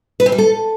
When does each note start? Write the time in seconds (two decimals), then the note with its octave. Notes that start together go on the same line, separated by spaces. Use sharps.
0.20 B4
0.26 C4
0.32 G3
0.38 A4